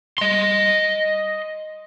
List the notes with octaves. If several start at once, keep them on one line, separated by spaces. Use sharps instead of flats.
D#5 C6